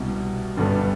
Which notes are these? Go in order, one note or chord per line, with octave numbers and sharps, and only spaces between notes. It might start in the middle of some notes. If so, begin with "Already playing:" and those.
Already playing: C2 B2 G3
G1 G2 D3 G3 B3